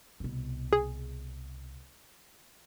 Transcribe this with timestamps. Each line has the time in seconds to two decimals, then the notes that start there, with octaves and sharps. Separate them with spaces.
0.20 C2 B2
0.73 G#4